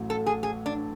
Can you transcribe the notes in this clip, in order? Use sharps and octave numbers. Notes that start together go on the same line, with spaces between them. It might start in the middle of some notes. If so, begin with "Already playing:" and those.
Already playing: A1 A2 F#3
A4
G#4
G#4
D4